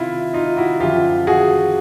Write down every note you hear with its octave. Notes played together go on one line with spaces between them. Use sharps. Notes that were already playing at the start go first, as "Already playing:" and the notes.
Already playing: C3 D#3 E4 F4
D#4 F4
E4 F#4
F#2 D3 F3 F4 G4
F#4 G#4